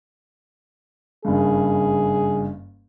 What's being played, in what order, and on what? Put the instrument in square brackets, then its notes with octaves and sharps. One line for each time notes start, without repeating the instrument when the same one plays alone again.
[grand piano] F#1 G2 [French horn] G#4